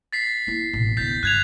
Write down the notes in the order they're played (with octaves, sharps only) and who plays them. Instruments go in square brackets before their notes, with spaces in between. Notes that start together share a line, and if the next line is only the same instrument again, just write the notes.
[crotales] A6 B6 C7
[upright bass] A#3 E4
A1 B2
[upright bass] E2 D3 [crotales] G6 A6 B6
[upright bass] G2 [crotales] F#6 G#6 F7